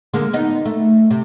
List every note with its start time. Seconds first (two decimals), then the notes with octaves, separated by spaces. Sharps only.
0.13 D3 G#3 A#3
0.33 B3 D#4
0.65 A3
1.10 C3